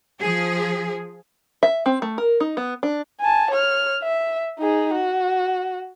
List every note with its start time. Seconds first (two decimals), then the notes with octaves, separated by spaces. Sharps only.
0.20 F3 G#4
1.63 E5
1.86 C4
2.02 A3
2.18 A#4
2.40 D#4
2.57 B3
2.83 D4
3.20 G#5 A5
3.51 C#5 F6
4.03 E5
4.59 D#4 G#4
4.94 F#4